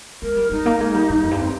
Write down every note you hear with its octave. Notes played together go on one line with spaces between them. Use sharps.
G#3 A#4
G3
G3 D#4
A#3
G#3
G3
G#2
F2
G2
C4